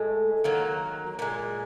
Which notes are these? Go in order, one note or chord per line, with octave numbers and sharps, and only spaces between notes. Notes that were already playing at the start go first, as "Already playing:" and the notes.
Already playing: A2 G#3
D#3 F#3 A#3
A#2 F3 G#3